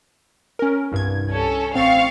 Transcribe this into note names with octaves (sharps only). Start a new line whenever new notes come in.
C#4 A#4
C2 G2 G#6
C#4 A4
A1 C4 F5 C#6 A6